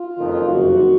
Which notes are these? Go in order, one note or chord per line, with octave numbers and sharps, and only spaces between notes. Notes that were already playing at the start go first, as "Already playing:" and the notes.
Already playing: F4
F#1 F2 D#3
F#1 F2 C3 D#3 F#4